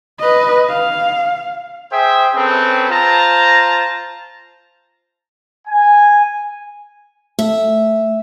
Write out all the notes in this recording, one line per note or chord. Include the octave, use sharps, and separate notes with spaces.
B4 D#5
F5
G#4 C5 E5 G5
C4 C#4 G#4 A4 B4
F4 C5 A5 A#5
G#5
A3 E5